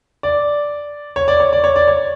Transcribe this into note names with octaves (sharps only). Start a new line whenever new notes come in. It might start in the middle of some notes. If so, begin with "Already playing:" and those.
D5
C#5
D5
C#5
D5
C#5
D5
C#5